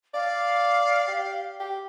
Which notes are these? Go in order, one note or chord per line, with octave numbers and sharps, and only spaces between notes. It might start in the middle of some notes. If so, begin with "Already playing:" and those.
D5 F5
G4
G4